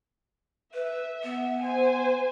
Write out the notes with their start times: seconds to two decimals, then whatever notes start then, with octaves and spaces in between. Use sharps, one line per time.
0.74 B4 E5
1.24 B3
1.60 C5 G#5